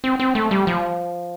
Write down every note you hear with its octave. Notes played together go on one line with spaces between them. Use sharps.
C4
C4
A3
G3
F3